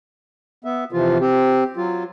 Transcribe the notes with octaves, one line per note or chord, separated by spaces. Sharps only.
B3 E5
C3 E3 F3 F4
C4 G4
F#3 F4